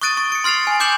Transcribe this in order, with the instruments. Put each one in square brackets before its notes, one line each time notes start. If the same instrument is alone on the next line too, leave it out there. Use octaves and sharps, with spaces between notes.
[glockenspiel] C#6 D#6 F#6 A6 D7 D#7
C#6
C#7 D7
C6 F6 A6 C7 F7
G#5
G#5 D6 G6 C#7 E7 F#7